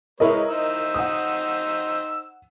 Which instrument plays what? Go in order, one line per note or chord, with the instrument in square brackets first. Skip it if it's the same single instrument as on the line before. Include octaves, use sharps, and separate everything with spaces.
[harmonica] G#3 B4 C#5 [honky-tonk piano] E4 A#4 D#5
[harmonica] D#4 C5 E6
[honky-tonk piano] F#5 D#6